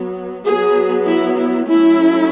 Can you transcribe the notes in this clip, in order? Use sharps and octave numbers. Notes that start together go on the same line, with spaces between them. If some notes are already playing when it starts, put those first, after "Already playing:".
Already playing: F#3 B3
F#3 B3 G#4
E4
E4
F#3 A3 C#4 E4